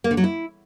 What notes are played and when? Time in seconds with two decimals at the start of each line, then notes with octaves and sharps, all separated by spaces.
0.04 A#3
0.11 D3
0.17 F#3
0.24 E4